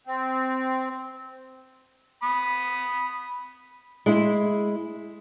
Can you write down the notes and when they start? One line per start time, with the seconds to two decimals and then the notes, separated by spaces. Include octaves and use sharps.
0.07 C4
2.23 B5 D#6
4.06 G#3 E4